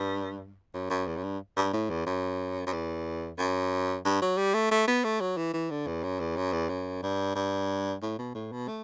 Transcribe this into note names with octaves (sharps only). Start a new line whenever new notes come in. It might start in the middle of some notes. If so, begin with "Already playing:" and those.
Already playing: G2
F#2
F#2
E2
F#2
G2
G2
A2
E2
F#2
F#2
E2
F#2
G2
F#3
G3
A3
A3
B3
A3
F#3
E3
E3
D3
E2
F#2
E2
F#2
E2
F#2
G2
G2
A2
B2
A2
B2
A3